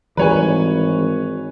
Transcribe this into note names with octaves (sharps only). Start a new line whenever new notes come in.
G#1 E3 G3 G#3 B4 C#5 G#5